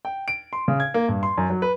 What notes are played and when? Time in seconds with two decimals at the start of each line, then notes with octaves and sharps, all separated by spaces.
0.05 G5
0.28 D7
0.53 C6
0.68 C#3
0.80 G#6
0.94 A#3
1.08 G2
1.23 C6
1.37 F#2
1.50 F#3
1.62 B4